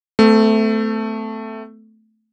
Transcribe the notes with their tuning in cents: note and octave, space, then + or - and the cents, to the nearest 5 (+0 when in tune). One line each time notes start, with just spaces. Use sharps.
A3 +0 C4 -45